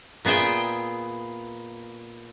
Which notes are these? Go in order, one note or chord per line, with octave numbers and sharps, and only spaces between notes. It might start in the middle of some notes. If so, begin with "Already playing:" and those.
A#2 B3 G#4 E5 G5